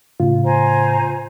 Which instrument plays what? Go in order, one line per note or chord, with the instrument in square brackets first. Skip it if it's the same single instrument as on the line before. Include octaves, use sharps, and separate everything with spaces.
[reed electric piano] A2 C#3 F4
[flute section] C5 G#5 A#5